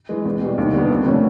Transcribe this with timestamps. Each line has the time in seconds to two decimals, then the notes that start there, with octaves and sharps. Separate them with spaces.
0.09 E3 G#3
0.25 E2
0.41 B2 G3
0.58 D#2
0.73 D3 G3 B3
0.90 F2
1.05 D3 F3 A3 C#4